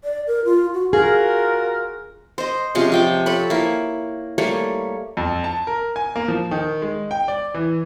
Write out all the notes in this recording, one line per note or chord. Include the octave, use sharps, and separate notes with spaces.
D5
A#4
F4
F#4
F4 F#4 G#4 A#4
C5 D#5
C3 F3 G#3 C#4
F3 G5 D6
A4 C#5 B5
A#3 E4
G3 A3 A#3 C#5
F2
A5
A#4
G#5
A#3
F3
D#3
G#3
G5
D5
E3